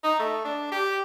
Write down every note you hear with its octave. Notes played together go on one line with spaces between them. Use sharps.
D#4
A3
D4
G4